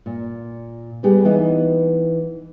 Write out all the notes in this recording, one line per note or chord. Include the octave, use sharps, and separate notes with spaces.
A#2
G3 B3 G4 G#4
E3 B3 D#4